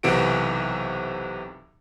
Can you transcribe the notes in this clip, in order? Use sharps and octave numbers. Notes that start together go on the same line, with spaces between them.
B1 C3 E3 F#4 D7